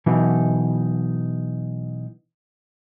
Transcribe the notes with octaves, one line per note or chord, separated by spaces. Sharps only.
B2 E3 F#3 D#4